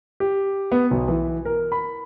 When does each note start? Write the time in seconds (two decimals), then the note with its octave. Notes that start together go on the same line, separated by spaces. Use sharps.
0.20 G4
0.72 B3
0.91 B1
1.08 E3
1.45 A#4
1.72 B5